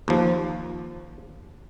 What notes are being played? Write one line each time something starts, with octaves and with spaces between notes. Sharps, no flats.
D#2 F3